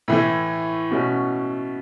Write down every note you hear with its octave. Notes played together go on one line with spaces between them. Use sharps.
A2 E3 A3
B2 A3 C#4 F#4